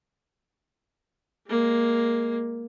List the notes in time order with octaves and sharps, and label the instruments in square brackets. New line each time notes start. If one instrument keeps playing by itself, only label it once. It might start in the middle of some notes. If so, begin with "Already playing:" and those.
[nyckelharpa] G#3 A#3